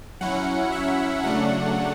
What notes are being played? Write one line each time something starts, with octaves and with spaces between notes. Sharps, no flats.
F#3 C#4 E4 F#5
E5
C#3 F#3 A3 D4 F#5